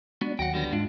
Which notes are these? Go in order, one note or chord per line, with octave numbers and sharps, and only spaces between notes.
G#3 B3 D4 F#4
D#2 F#3 F#5 G5 A#6
D3 G3 B3
G#2 G#3 D4 F4